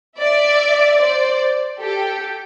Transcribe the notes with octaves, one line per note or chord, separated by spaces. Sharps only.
D5 E5
C5 D5
G4 A4